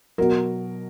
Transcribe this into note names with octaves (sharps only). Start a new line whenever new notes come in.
B2 F#3 A#4